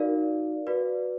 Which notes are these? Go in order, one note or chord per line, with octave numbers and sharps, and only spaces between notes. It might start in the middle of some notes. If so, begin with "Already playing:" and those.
Already playing: D#4 F#4 A#4 D5 F5
F#4 B4 D5